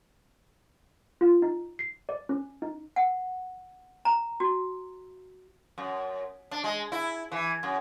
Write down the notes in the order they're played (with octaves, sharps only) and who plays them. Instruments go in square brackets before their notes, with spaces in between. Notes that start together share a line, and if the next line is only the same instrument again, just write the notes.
[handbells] F4
D#4
C7
D5
C#4
D#4
[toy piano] F#5
A#5
F#4
[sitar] F#2
D4
G#3
E4
E3
F#2